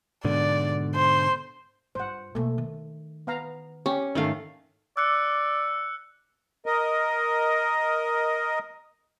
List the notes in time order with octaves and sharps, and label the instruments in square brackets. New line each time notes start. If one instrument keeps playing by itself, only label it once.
[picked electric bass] G#2 B2 D3 [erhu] D5
[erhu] C5
[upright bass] G2 F4 [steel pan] C5 F#5
[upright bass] B2 A#3 [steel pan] A3
[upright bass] D#3
[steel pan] B3 F5 A#5
[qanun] C#4 [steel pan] G4
[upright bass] G#2 [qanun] D#3 A3 F5 [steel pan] C#4 A4
[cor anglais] D5 [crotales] E6 F#6 C#7
[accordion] A#4 D#5